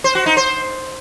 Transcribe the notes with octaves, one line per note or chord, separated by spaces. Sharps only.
C5
F#4
D#4
C5